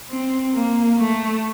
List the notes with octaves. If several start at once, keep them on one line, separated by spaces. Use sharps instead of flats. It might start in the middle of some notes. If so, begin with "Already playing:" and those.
C4
A#3
A3